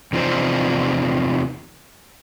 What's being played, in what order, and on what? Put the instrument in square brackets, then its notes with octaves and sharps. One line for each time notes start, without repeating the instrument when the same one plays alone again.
[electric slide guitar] E2 C3 F3 D4 D#4 C5